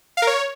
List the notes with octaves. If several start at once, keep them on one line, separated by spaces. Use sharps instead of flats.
F5
A#4
C#5